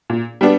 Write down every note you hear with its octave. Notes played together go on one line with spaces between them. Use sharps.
A#2
G3 B3 D4